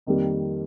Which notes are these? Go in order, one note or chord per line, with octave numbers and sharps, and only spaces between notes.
F2 D#3 G3 A#3